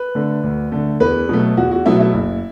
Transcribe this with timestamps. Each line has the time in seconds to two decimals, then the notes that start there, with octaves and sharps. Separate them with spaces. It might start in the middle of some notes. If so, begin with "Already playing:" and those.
Already playing: B4
0.15 D3 A3
0.43 D2
0.72 D3 A3
1.00 E2 B4
1.29 B2 F#3 A3
1.57 E2 F#4
1.71 F#4
1.86 B2 F#3 A3 E4
2.00 E4
2.14 F#1